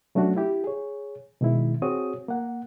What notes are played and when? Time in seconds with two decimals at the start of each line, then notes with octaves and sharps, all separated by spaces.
0.15 F#3 A3 C#4 D4 F#4
0.37 E4 G4
0.64 G#4 C#5
1.41 B2 D#3 G#3 E4
1.82 C4 F#4 G#4 C#5 D#6
2.28 A#3 F#5